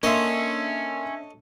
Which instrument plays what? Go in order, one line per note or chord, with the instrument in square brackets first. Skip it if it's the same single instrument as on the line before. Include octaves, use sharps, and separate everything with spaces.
[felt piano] A#3 C6 [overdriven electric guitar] C#4 [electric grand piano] D4 E5 [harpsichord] A4 C#5 D#5